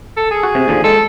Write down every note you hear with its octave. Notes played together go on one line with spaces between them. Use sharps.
A4
G#4
F#4
C3
D#2 D3 F3
G#3 A4